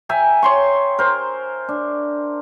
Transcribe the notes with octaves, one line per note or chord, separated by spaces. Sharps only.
E5 G5 G#5 A#5
C#5 C6 C#6
A#4 C5
D4